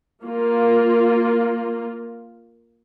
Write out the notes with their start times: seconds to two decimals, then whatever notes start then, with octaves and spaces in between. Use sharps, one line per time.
0.24 A#3 F4